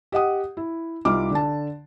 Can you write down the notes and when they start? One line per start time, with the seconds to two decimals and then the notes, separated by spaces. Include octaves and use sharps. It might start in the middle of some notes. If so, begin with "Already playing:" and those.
0.12 G4 D#5 F#5 D#6
0.57 E4
1.05 C2 D#4 F4 D6 F6
1.31 D3 A5